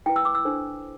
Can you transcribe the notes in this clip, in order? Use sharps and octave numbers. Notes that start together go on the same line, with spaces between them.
E4 B4 G5
E6
D6
E6
D4 A4 C5